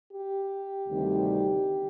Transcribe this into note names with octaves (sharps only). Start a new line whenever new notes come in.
G4
D2 C3 D#3 G3